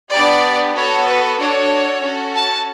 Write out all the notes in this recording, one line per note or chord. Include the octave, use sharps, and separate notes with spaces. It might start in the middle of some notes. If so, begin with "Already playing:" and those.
B3 D4 G4 D5
B3 F#4 A4 C#5
B4
D4 F#4 A4 C#5
C#4 F#4 A4
A5